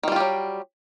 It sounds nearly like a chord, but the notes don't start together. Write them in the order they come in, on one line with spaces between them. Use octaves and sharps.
D#3 G3 F4 G4 F#3